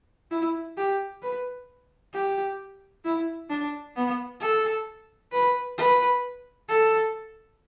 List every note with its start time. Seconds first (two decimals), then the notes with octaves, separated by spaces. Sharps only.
0.31 E4
0.77 G4
1.22 B4
2.13 G4
3.05 E4
3.50 D4
3.96 B3
4.41 A4
5.32 B4
5.78 B4
6.69 A4